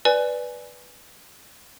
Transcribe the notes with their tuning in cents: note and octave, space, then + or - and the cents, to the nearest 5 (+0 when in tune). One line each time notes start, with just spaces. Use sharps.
B4 +0 D5 +0 G#5 +10